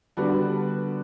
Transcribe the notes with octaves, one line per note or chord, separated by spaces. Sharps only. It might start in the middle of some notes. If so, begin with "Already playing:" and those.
D3 G3 B3 D4 F#4